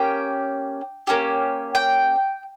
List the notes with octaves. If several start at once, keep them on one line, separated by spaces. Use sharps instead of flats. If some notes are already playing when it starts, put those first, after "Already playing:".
Already playing: A#3 C#4 G4 G5
A#3 C#4 G4
G5